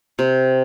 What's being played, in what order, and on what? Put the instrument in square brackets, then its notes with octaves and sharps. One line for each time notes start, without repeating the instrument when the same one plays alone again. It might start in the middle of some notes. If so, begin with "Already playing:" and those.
[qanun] C3